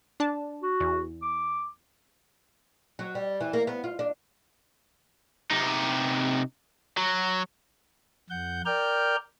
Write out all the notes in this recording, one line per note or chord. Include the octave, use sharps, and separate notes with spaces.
D4 A5
F#4
E2
D6
F#3
G3
E3
A#3
B3
F4
D4
C3 D#4
F#3
F2 F#5 G6
A#4 D5 G5 F6 G6